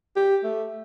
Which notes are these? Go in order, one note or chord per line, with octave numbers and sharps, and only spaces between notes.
G4
A3